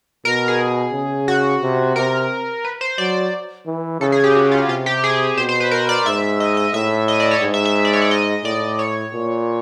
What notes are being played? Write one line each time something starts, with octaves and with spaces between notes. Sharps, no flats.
B2 A#4
G#4
C#3
F#4
C3
C3 A#4
B4
C5
F#3 D5
E3
C#3 A4
G#4
G4
F#4
F4
C3 F4
G4
G#4
B2 C5
C5
B4
A#4
D5
G#2 E5
D#5
D#5
A2 E5
D#5
D5
C#5
G#2
E5
E5
D5
C#5
D5
D#5
A2 D5
C#5
A#2